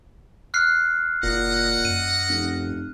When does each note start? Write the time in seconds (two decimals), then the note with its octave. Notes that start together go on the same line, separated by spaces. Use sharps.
0.54 F6 F#6 C7
1.23 F#1 A#2 D#5 F#5
1.85 F#2 D#7
2.29 F1